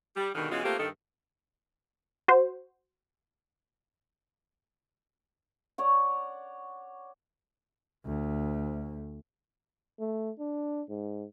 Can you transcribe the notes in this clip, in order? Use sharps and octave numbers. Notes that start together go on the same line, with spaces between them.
G3
G2 B2 D3 D#3
B2 E3 G#3 B3 C#4 F4
A3 A#3 C4 F4 G4
G2 D#3 A4
F#4 C5
C#5 D5 F#5
D2
A3
D4
G#2